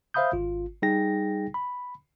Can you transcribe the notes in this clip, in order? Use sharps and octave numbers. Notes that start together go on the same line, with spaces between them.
C5 E5 F5 B5 D#6 G6
G#1 F4
G3 D#4 G#4 G5 A#6
B5